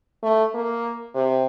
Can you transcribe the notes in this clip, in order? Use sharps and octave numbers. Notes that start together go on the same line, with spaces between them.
A3
A#3
C3